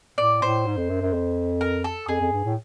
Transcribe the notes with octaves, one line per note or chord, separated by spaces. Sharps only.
A2 D5
A2 C5
G#2
F2
F#2
F#2
F2
A#4
A4
F2 G#4
F2
G2
A2